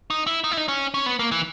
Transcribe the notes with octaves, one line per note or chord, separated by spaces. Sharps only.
D#4
E4
D#4
E4
D#4
C#4
C#4
B3
A#3
E3